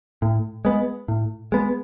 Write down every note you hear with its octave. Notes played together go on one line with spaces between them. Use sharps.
A2
G#3 B3
A2
G#3 B3